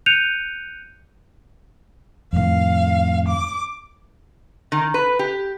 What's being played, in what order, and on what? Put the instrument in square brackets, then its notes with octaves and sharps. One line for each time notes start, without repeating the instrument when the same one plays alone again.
[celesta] F#6 G6 C#7 D#7 F7
[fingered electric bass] F2 A2 D#3 [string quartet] F5
[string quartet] D6
[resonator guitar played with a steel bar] D#3
B4
G4